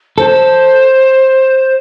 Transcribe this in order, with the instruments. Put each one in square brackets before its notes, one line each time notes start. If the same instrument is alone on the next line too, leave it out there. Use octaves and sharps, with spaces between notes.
[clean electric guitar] A4 [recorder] C5